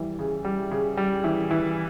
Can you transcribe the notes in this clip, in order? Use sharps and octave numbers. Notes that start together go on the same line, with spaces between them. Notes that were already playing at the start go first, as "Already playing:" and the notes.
Already playing: E3 G3
C#3
G3
C#3
G3
E3
E3